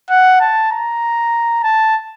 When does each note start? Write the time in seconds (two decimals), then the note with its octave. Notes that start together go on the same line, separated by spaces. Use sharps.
0.10 F#5
0.41 A5
0.72 A#5
1.64 A5